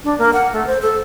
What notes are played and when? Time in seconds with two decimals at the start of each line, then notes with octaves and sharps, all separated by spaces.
0.04 D4
0.18 A#3
0.33 F#5
0.53 A3
0.67 C5
0.82 A4